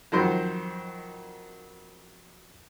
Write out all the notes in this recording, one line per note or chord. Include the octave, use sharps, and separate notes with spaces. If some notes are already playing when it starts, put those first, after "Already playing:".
F2 D#3 F#3 C5